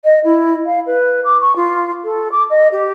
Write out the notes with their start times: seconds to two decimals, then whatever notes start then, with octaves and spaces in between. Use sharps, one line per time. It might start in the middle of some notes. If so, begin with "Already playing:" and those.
0.04 D#5
0.24 E4
0.65 F5
0.86 B4
1.24 D6
1.41 C#6
1.56 F4
2.04 A4
2.31 D6
2.50 D#5
2.71 G4